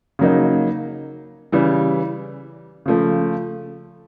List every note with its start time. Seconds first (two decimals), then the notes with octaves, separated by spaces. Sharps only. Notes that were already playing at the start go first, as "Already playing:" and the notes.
0.19 C#3 F#3 A#3 D#4
1.52 C#3 E3 G3
2.86 C#3 F3 A3